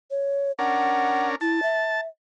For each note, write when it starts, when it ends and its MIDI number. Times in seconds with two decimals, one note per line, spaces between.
0.11 0.52 73
0.59 1.35 61
0.59 1.35 62
0.59 1.35 70
0.59 1.28 78
1.41 1.60 64
1.41 2.01 81
1.62 2.07 76